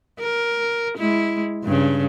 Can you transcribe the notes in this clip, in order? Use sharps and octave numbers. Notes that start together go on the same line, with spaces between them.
A#4
G#3 E4
G2 C#3